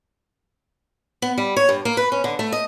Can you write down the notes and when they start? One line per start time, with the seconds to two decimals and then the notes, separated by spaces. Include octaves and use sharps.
1.22 B3
1.38 G3
1.56 C#5
1.69 G2
1.85 A#3
1.97 B4
2.12 C#4
2.24 D3
2.39 A3
2.52 D#5